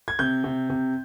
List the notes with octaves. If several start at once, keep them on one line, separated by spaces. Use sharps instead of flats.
G#6
C3 G6
C3
C3